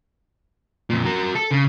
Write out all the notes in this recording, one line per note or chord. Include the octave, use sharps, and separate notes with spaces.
F2 A#2
F#4 A#4
A4
C#3